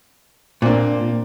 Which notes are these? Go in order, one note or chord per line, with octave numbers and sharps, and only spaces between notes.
A#2 A#3 C4 D4